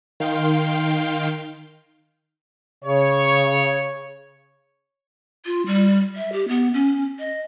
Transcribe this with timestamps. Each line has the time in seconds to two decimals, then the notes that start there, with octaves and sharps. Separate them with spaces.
0.20 D#3 F5 G5 C6
2.84 C#3 C#5
5.46 F4
5.66 G3
6.16 E5
6.32 G4
6.48 B3
6.74 C#4
7.19 D#5